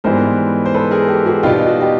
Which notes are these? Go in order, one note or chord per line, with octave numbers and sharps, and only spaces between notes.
G#2 E3 G3 B3 A#4 C5
C5
A4 B4
G#4 A#4
G4 A4
F#4 G#4
B2 G3 B3 D#4 F4 G4
F#4
G4